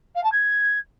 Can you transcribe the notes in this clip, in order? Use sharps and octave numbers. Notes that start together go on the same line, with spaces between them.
F5
A5
G#6